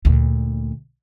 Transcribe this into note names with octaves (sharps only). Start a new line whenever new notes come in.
D2 A#2